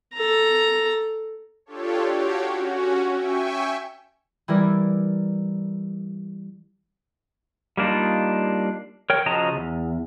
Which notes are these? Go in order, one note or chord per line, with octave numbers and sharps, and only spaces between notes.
A4 A#5
D4 F4 G4 A4 C#5
F#4 G4 C#5 F5 G5
C#4 F#4
E5 G5 G#5 C#6
E3 G3 E4 A#4 D5
G3 A#3 D4 D#4 F4
A#4 C#5 G5
C#3 F3 F#3 D#5 A5 A#5
E2